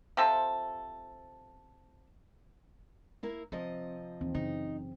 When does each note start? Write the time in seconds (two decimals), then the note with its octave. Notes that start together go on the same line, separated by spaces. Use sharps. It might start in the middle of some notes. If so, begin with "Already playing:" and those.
0.17 C3 F3 F4 A4
3.23 A#3 E4 A#4
3.52 C3 F3 C4 D#5
4.21 D#2 E3 C4
4.35 F#2 C#3 D#4